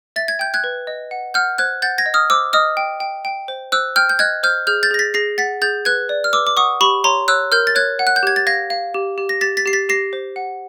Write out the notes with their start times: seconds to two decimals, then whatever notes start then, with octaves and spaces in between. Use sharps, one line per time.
0.16 E5 A6
0.28 G#6
0.39 G5 G6
0.54 F#6 G#6
0.64 B4
0.87 D#5
1.11 F#5
1.34 F#5 F6 G6
1.58 C5 F#6 G#6
1.82 F#5 G6 A6
1.98 G#6 A#6
2.06 D#5
2.14 D#6 F6
2.30 C5 D6 E6
2.53 D#5 D#6 F6
2.77 G5
3.00 G5
3.25 G5
3.48 C5
3.72 C5 E6 F#6
3.96 G5 F6 G6
4.09 G6
4.19 D#5 F#6 G#6
4.43 C5 F6 G6
4.67 G#4 F6 G6
4.83 G6 A6
4.91 G#4 A#6
4.99 A6 B6
5.14 G#4 A#6 C7
5.38 F#5 A6 B6
5.62 G#4 G6 A6
5.85 B4 F#6 G#6
6.09 D5
6.24 F6
6.33 B4 D6 E6
6.47 D6
6.57 F#5 C#6 D#6
6.81 G4 B5 C#6
7.04 C#5 A#5 C6
7.28 C#5 E6 F#6
7.52 A#4 F6 G6
7.67 A6
7.75 C#5 F#6 G#6
7.99 F#5
8.07 F#6
8.16 G6
8.23 G4 G#6
8.36 A6
8.47 F5 G#6 A#6
8.70 F5
8.94 G4
9.18 G4
9.29 A#6
9.41 G4 A6 B6
9.57 A6 B6
9.66 G4 C7
9.73 A6 B6
9.89 G4 A#6 C7
10.13 C5
10.36 F#5